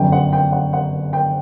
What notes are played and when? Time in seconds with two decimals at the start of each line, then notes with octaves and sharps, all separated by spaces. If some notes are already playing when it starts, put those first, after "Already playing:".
Already playing: G1 F#2 D3 G5
0.12 F#5
0.33 G5
0.52 F#5
0.73 F#5
1.13 G5